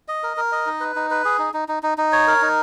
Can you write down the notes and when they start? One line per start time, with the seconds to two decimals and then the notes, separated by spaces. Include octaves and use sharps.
0.08 D#5
0.23 A#4
0.37 A#4
0.52 D#5
0.66 D#4
0.80 B4
0.96 D#4
1.10 B4
1.25 G#4
1.39 D#4
1.54 D#4
1.68 D#4
1.83 D#4
1.98 D#4
2.12 C#5
2.27 A#4
2.42 D#4